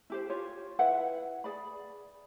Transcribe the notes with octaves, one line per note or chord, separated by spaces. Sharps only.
E4 G4 C5
F4 G4 C#5
E4 B4 E5 F#5
G#4 D5 B5